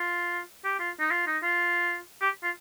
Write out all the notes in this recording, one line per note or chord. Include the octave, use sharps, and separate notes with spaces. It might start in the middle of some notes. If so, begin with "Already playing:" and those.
Already playing: F4
G4
F4
D#4
F4
D#4
F4
G4
F4